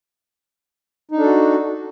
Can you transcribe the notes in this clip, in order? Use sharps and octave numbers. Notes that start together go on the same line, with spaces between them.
D4 D#4 F#4 A4